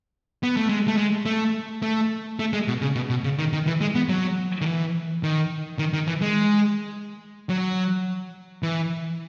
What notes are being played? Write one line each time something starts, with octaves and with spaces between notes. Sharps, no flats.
B3
A3
G#3
A3
G#3
A3
A3
A3
G#3
B2
C#3
B2
B2
C#3
D#3
D#3
E3
G#3
B3
F#3
D#3
E3
D#3
D#3
D#3
E3
G#3
F#3
E3